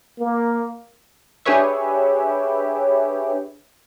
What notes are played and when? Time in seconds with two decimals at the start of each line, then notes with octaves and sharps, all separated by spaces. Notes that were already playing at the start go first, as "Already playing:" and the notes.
0.19 A#3
1.45 D4 G4 G#4 B4 C#5 E5